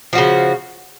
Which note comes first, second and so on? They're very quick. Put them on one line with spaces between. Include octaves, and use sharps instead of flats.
F3 F#4 C#3